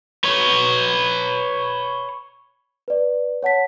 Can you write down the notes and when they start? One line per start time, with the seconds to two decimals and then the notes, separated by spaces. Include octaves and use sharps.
0.24 B4 C#5
2.88 B4 D5
3.43 C#5 F#5 A5 B6